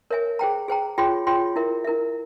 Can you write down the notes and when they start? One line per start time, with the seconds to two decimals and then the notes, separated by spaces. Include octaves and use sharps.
0.10 A#4 C#5 E5 G#5
0.39 G#4 C5 G5 A#5
0.68 G#4 C5 G5 A#5
0.98 F4 G#4 C#5 G5 C6
1.27 F4 G#4 C#5 G5 C6
1.56 E4 A#4 E5
1.84 E4 A#4 E5